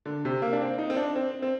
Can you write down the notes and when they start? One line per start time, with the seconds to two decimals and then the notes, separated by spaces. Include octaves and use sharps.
0.05 D3
0.25 C3
0.42 A#3
0.53 D4
0.61 C4
0.78 D#4
0.90 C4
0.97 D4
1.16 C4
1.42 C4